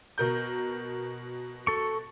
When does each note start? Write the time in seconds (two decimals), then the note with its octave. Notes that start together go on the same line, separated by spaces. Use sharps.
0.18 B2 A#4 G6
1.67 A4 C#6